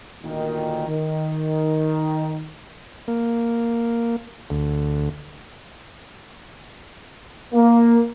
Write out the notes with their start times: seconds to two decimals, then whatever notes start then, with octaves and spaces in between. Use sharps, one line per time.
0.22 D2 A#2 D#3
0.88 D#3
3.08 A#3
4.50 D2
7.53 A#3